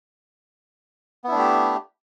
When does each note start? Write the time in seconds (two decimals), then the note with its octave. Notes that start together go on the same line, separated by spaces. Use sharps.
1.24 B3
1.28 E4
1.32 D4
1.35 A3
1.39 G4